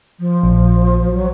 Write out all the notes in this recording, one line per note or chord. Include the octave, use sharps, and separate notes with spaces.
F3
A#1
F#3